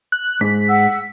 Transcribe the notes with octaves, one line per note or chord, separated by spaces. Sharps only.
F#6
G#2 B6
F#5 E6